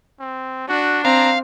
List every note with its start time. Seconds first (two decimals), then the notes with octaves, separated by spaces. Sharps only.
0.20 C4
0.68 D4 F#4
1.05 C4 F5 A#5